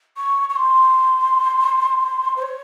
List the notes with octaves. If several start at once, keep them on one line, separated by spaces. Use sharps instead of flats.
C#6
C#6
C6
C5
C#5